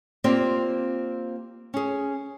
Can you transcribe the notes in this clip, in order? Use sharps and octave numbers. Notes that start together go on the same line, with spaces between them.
A#3 C4 F4 G4 D5
C#4 G#4